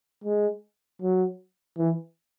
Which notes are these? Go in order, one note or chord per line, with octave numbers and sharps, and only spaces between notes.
G#3
F#3
E3